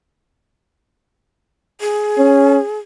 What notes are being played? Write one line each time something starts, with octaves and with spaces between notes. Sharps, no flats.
G#4
C#4